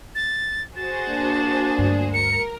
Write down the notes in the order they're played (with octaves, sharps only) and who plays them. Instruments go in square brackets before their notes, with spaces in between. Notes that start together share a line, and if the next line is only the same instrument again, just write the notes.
[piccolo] A6
[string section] F#4 G#4 C5 [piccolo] A6
[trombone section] A#3 D4
[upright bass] D2 G2
[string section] A#4 [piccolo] C#7